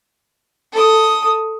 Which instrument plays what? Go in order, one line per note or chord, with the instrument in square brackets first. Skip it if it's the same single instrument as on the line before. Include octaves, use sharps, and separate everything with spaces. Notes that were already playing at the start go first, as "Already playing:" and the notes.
[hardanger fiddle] A4 D#6